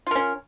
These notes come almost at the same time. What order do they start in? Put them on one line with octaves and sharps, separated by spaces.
F4 A#4 C#4